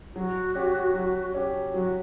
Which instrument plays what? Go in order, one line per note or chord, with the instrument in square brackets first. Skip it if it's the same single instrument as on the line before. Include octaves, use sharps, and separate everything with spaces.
[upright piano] F#3 [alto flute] F#4
[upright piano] C#4 G4
F#3
C#4 G4
[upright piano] F#3 [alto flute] F#4